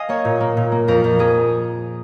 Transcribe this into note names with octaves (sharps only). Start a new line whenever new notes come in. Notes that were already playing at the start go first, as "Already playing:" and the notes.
Already playing: D#5 F5 G#5
A#3 C#5
A#2
A#3
A#2
A#3
F2 A#4
F2
A#3 G#4